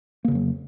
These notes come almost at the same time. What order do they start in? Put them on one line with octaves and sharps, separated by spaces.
A#3 C#3 F2 F#3